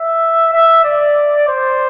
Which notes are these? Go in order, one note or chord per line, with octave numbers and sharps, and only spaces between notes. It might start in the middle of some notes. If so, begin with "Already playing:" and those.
Already playing: E5
E5
D5
C5